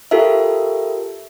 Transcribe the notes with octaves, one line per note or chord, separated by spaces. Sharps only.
F4 G4 A4 A#4 E5